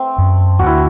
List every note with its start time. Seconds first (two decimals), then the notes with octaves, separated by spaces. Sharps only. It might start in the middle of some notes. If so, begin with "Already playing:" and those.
Already playing: A3 C4
0.18 F#2
0.59 D2 F#4
0.66 E4